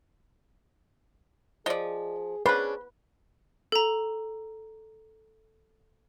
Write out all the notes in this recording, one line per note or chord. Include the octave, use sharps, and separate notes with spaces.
F3 G#4 D5 D#5
C#4 D4 G#4 B4 C5
A4 A#5